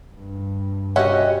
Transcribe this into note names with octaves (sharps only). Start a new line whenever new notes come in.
G2
C#4 F#4 G4 D#5 E5 F#5